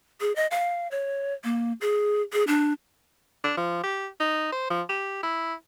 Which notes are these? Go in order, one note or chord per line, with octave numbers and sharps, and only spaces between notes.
G#4
D#5
F5
C#5
A#3
G#4
G#4
D4
D4
F3
G4
D#4
C5
F3
G4
E4